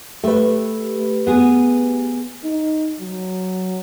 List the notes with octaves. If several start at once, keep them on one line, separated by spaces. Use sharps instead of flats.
A3 G4 B4
B3 G#4
D#4
F#3